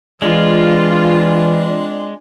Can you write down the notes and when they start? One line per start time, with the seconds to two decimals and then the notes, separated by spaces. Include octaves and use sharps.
0.22 E3 G#3 C4 D4 F4